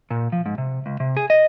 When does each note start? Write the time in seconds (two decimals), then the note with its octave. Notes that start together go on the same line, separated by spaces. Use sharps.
0.11 A#2
0.32 F3
0.46 G#2
0.58 C3
0.86 C#2
1.00 C3
1.17 G#4
1.30 D#5